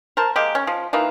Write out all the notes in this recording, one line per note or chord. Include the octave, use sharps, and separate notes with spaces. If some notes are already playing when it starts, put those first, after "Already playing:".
A#4 C5 A5
G#3 A#3 G4
C#4
F3
E3 A#3 D#4 F4